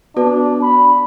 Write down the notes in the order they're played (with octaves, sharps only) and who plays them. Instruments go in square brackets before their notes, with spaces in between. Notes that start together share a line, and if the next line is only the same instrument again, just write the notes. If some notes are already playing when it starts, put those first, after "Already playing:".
[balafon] B3 F#4 B4 [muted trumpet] D4
[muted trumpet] B5